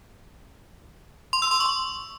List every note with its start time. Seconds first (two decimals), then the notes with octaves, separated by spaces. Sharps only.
1.33 C6
1.42 E6
1.51 C6
1.60 C#6